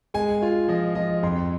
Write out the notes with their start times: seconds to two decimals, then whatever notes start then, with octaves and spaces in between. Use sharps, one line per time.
0.14 G#3 G#5
0.42 F4
0.68 F3 D#5
0.95 F3 D#5
1.23 F2 C6